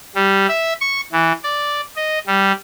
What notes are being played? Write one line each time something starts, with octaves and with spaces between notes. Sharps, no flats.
G3
E5
C#6
E3
D5
D#5
G3